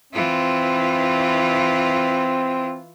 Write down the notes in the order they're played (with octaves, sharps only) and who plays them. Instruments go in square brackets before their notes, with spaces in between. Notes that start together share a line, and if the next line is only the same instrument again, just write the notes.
[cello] E3 F4 [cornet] C4